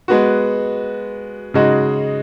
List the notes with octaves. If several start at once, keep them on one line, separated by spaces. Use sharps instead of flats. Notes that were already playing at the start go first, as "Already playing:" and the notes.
G#3 B3 F#4
C#3 G#3 D#4 F#4